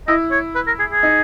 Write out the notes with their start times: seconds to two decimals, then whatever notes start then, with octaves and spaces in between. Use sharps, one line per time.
0.08 E4 D#5
0.31 C#5
0.56 B4
0.67 A#4
0.80 G#4
0.91 G#4
1.03 D#4